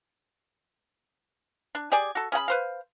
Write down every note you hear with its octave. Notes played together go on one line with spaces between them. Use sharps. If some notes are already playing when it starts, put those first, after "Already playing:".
D4
G4 G#4 D5 G#5
F#4 A4
C#4 G#4 F#5 B5
B4 C5 F5